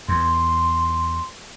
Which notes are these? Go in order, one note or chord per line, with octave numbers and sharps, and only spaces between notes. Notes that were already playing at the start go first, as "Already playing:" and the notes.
E2 C6